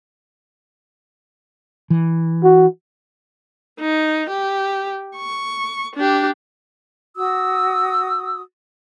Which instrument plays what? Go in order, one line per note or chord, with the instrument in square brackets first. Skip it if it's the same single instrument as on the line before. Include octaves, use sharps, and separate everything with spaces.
[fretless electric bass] E3
[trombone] F#4
[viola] D#4
G4
C#6
D4 G4
[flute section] F#4 D#6 E6